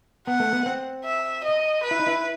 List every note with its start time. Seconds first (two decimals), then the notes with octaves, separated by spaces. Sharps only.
0.27 B3 F#5
0.40 A3
0.52 B3
0.66 C4
1.05 E5
1.44 D#5
1.83 B4
1.91 E4
1.99 D#4
2.07 E4